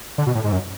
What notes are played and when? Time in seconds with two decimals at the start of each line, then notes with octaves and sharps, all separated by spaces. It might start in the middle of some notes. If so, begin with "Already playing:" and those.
0.18 D3
0.27 B2
0.35 A2
0.44 G#2
0.52 F#2